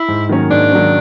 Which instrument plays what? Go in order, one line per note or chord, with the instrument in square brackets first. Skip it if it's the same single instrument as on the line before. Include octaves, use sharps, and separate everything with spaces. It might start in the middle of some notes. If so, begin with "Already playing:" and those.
Already playing: [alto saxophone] E4
[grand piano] G#2
D#3 F#3 A#3 C#4
[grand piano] G#2 [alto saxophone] D4
[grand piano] D#3 F#3 A#3 C#4